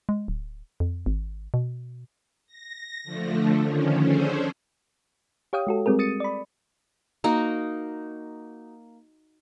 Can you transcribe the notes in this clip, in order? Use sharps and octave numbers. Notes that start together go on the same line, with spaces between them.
G#3
D1
F2
G#1
B2
A#6
D3 F3 A3
D3 D#3 F3 C#4
C#4 D4 G#4 A4 C5
G4 C#5 F5 G5 D#6
G#3 F#4 A4
G3 G#3 C4 G#4 A#4
D#6 A6 C#7 D#7
D5 B5
A#3 D#4 F#4